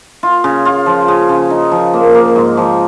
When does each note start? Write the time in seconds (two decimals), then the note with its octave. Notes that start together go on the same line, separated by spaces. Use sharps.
0.23 F4
0.44 C#3
0.65 F4
0.86 F3
1.08 C#3
1.29 C#3
1.50 D#4
1.72 F3
1.93 A#3
2.15 A#3
2.36 G#2
2.57 F3